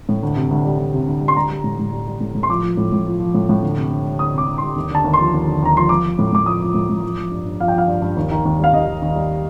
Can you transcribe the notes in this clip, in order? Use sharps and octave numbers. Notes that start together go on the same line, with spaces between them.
A2
D2
C3
D2
G3
D2
C3
D2
G3
C6
G3 A#5
G3
A2
A2
G3
G3
A2
A2
C6
F3 D6
F3
A2
A2
F3
F3
A2
A2
D2
C3
D2
G3
D2 D#6
C3 D6
D2
G3 C6
D#2
D3 A5
D#2
C6
F3
D#2
D3
D#2 A#5
F3 C6
F3 D6
F3
A2
A2 D6
F3 D#6
F3
A2
A2
F3
F3
G2
G2
F3 F5
G5
F3 F5
G2
G2
D#2
D#3
D#2
G3 F5
D#2 D#5
D#3
D#2
G3